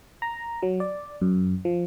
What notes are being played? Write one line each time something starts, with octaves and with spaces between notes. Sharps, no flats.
A#5
F#3
D5
F#2
F3